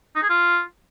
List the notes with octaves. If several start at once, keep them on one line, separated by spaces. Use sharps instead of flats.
D#4
G#4
F4